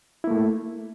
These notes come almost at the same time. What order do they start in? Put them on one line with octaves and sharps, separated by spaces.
E4 A#3 A3